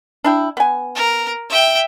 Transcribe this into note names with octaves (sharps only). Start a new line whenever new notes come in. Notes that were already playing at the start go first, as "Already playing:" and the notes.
D4 E4 G5
B3 G#5
A#4
E5 G5